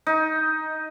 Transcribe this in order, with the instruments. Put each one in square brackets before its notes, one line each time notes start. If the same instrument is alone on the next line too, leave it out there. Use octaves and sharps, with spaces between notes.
[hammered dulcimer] D#4